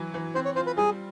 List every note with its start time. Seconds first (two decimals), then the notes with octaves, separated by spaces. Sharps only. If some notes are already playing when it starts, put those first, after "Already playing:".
Already playing: E3 F#3
0.14 E3
0.35 C4 C5
0.45 C#5
0.56 F4 C5
0.67 B4
0.77 G3 G#4